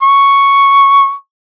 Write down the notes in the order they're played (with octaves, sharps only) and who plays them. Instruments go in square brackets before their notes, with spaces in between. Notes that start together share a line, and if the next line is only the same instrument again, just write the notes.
[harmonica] C#6